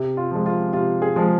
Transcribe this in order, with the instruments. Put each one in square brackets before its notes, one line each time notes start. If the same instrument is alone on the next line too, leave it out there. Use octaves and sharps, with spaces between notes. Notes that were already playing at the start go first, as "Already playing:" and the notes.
Already playing: [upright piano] C3
F4
F3 G#3
F4
C3 F4
G#4
F3 G#3